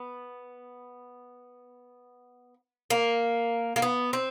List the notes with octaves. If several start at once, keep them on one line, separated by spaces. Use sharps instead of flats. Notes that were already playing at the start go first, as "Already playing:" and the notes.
Already playing: B3
A#3
A#3
B3
C4